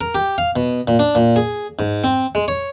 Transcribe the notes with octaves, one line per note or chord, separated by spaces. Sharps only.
A#4
G4
F5
B2
A#2
D4
A#2
G#4
G#2
C4
G#3
C#5